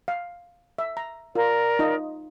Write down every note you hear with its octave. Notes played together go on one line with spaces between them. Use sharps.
F5
E5
A#5
F4 A#4 D5
D#4 F4 D#5